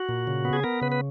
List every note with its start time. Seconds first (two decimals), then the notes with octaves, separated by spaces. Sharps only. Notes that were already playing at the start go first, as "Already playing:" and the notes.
Already playing: F#4
0.09 A#2
0.27 C#3
0.45 B3
0.53 G#4
0.63 B3 A#4
0.82 C#3 B4
0.92 B4